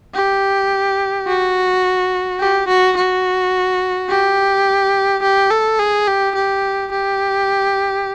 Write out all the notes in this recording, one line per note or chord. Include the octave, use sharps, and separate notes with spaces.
G4
F#4
G4
F#4
F#4
G4
G4
A4
G#4
G4
G4
G4